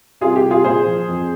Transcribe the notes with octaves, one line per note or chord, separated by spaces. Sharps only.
C2 F4 G#4
G4
C2
F4 G#4
A#2 G#4 C5
F3
F2